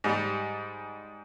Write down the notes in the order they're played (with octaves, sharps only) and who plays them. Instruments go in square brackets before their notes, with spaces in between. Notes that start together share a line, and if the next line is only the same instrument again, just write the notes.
[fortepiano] G#2 G3